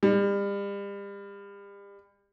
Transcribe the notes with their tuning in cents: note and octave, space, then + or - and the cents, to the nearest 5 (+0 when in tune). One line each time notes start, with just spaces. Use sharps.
G3 +35